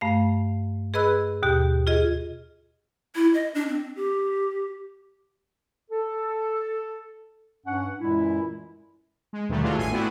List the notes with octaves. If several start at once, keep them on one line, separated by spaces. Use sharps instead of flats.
G2 A3 F5
G#4 B4 D#5 B5 E6 F#6
D#2 B2 G4
F4 G#4 D#5
E4
D#5
D4
C4
G4
A4
G2 C#4 F#5
F#2 A#2 E3 G#3 E4
G#3
D#2 B2 D3 D#3 G3 A3
E3 F#3 G#3 A3 D4 F4
G#1 A2 A3 G#5 C7 D#7
A3 B3 C4 D4 E4 F#4